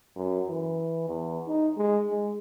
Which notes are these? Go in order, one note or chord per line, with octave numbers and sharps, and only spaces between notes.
F#2
E3
E2
D#4
G#3
G#3